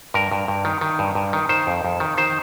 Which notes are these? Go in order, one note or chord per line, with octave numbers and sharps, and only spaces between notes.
G2 A#4
G2
G2
D#3
D#3
G2
G2
D#3
D#3 C5
F2
F2
D#3
D#3 C5